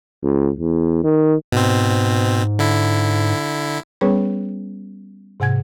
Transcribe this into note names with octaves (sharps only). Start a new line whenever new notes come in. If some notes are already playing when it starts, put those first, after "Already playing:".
C#2
E2
D#3
G#2 B2 C4
D3 E4
G3 B3 C#4 G#4 B4 C#5
G#2 C3 F#5 G#5 G#6